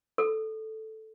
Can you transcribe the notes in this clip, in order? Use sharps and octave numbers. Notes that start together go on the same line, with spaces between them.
A4